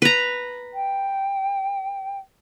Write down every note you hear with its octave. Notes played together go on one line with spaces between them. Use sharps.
B4 A#5
G5